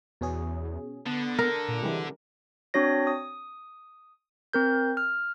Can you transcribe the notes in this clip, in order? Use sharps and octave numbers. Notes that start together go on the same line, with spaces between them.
E2 B2 C#4 G#4
D3 B3 A5
A#4
A#2
C3 E3 G3 G#3
C4 D4 F#4 C#5 A#6
D#6
C4 A#4 G6
F6